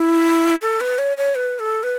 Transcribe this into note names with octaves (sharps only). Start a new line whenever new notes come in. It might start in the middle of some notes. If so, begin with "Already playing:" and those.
Already playing: E4
A4
B4
C#5
C#5
B4
A4
B4